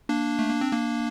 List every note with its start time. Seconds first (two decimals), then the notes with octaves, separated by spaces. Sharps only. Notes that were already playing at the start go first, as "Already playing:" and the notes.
0.09 A#3 D4
0.39 A3
0.50 A#3
0.61 C4
0.72 A#3 D4